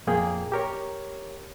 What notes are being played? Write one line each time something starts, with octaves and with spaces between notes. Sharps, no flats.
F2 A#2 A#3 G#4 G5
G4 A#4 C#5